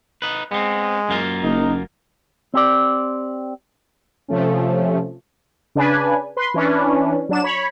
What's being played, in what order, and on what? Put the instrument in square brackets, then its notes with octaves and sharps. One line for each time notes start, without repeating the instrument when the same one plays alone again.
[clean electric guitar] D#4 B4
[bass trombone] G#3 [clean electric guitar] B3 C4
[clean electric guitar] F#2 A#3 F4
[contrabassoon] F#1 [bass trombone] D#4
[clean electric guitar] C4 G4 D5
[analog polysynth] C3 F3 A3 C#4
C#3 D4 B4 G#5
B4 C6
E3 C#4 D4 B4
F#3 D4 E7
C#5 B5